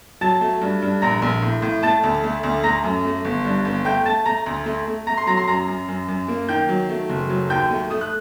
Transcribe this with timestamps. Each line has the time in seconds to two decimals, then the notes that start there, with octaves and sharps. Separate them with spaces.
0.21 F#3 A5 A6
0.41 A3
0.61 G2
0.82 G2
1.02 A#1 A#5 A#6
1.22 A#1
1.42 A2
1.62 A2
1.83 A3 A5 A6
2.03 D2
2.24 A3
2.43 D2
2.64 A3 A#5 A#6
2.84 F#2
3.05 A3
3.25 G1
3.45 G2
3.65 G1
3.85 A3 G5 G6
4.05 A3 A5 A6
4.25 A3 A#5 A#6
4.46 D2
4.66 A3
4.87 A3
5.06 A3 A#5 A#6
5.17 C6 C7
5.27 F#3 A#5 A#6
5.37 C6 C7
5.47 F#2 A#5 A#6
5.68 F#2
5.88 F#2
6.08 F#2
6.28 A#3
6.49 D#3 G5 G6
6.69 F#3
6.89 A3
7.09 F#1
7.29 F#3
7.50 D#2 G5 G6
7.71 A3
7.90 A3 D#6
8.01 F#6